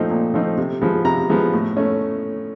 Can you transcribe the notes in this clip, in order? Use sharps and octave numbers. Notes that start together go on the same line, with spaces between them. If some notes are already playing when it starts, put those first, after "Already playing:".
Already playing: A#2 F3 A3 C4 D#4
A#2
F3 A3 C4 D#4
C3
F3 G#3 B3
C3 A#5
F3 G#3 B3
A2
A3 C#4